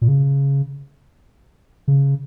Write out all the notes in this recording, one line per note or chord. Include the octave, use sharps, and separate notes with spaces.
A#2
C#3
C#3